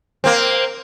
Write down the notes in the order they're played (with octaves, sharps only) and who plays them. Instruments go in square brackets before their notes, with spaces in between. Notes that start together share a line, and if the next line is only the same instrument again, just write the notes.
[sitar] A#3 C4